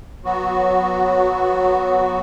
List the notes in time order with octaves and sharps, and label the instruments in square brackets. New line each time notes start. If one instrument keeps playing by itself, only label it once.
[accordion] F#3 B3 F#4